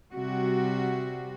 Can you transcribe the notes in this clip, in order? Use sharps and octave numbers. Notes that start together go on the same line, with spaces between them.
C3 G3 F#4